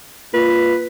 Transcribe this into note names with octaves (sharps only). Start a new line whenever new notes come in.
A#2 B4